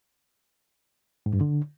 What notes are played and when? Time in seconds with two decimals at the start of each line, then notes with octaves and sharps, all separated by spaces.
1.26 G#2
1.33 G2
1.41 D3